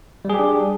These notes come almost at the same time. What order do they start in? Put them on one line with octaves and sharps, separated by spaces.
G3 G#4 G4 D4